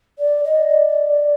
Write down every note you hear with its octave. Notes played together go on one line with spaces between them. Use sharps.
D5
D#5
D5